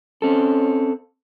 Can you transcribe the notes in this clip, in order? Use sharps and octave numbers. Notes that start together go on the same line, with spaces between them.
C4 C#4 A4